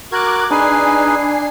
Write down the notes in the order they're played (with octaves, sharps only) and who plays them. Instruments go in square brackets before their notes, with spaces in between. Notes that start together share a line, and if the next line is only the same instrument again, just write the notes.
[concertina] F#4 A#4 [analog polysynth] D6 F#6 G#6
[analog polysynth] D4 G#5 C7 [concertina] D#4 G#4 B4